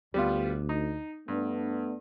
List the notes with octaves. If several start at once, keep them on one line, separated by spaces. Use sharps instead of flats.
D2 G3 B3 F4
D#4
G2 A3 B3 D4